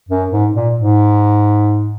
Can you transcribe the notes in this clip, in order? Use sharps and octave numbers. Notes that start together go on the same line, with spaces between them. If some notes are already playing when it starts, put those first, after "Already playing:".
F#2
G#2
A#2
G#2